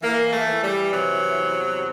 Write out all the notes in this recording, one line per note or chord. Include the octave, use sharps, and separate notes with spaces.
E3 A#3
A3
E3
G3
C3 F#3
E2